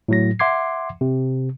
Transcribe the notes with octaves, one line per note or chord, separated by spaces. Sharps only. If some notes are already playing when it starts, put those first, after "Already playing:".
A2 F#3 A#6
E5 F#5 C6 D6 G#6 C7
C3